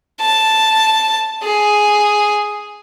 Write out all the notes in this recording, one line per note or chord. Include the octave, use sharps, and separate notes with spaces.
A5
G#4